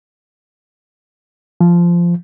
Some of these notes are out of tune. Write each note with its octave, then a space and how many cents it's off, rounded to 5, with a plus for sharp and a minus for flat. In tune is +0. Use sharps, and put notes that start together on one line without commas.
F3 -15